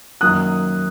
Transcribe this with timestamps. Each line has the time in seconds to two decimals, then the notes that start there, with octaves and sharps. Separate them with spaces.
0.21 F#2 D#3 F#3 A#3 C#4 D#6 F#6